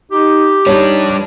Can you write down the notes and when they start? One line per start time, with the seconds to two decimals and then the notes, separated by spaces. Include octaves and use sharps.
0.12 D#4 G4
0.66 G3 D4 D#4 C#5
1.05 F3